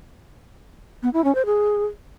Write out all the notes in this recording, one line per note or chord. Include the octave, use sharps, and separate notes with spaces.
B3
E4
C#4
C5
G#4